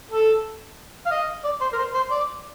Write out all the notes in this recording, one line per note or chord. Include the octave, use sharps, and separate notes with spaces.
A4
F5
D#5
D5
C5
A#4
C5
C5
D5